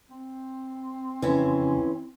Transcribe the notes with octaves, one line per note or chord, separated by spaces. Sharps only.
C4
F2 C#3 E3 C#4